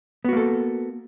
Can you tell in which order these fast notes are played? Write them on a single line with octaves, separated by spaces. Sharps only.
B3 F#4 A#3 A4